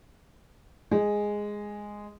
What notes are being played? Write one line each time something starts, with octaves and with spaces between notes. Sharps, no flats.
G#3